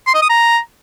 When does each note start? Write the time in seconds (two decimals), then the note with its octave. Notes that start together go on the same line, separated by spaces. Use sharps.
0.07 C6
0.14 D#5
0.22 D#6
0.29 A#5